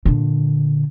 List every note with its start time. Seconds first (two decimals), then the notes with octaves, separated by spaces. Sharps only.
0.05 A#2 D3